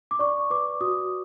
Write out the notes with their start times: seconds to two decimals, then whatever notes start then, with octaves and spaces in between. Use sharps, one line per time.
0.11 D6
0.19 D5 C#6
0.50 B4 D6
0.81 F#4 D#6